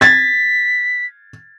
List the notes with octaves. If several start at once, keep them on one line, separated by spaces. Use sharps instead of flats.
G#6 A6 B6